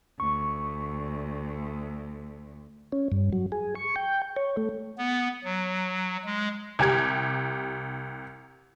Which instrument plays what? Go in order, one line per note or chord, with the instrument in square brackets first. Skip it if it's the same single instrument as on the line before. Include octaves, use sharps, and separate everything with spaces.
[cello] D2 [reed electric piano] C#6
[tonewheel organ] C#4
G2
F#3
G#4
C#6
G5
C#5
A3
[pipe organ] B3
F#3
G#3
[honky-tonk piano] C2 G4 G#6